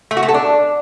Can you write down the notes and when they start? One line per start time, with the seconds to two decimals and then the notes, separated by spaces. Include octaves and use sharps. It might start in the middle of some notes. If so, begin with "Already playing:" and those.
0.11 A3
0.17 F#4
0.23 A3
0.28 A4
0.34 D4